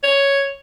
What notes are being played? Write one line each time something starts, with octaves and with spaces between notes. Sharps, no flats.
C#5